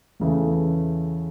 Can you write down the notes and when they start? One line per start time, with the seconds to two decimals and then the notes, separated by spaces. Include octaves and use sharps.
0.20 E2 C#3 E3 A3